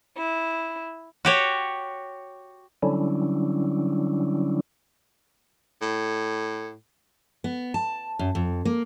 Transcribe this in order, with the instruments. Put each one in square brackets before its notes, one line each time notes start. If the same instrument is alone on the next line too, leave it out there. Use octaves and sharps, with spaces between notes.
[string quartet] E4
[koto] F#4 G4 C#5
[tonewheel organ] D3 F#3 G3 C#4 D4 E4
[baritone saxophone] A2
[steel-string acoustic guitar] B3
A5
F#2
F2
A#3